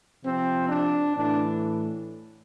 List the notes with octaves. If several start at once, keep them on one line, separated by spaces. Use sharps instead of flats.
C3 F3 C4
D4
A2 E3 D4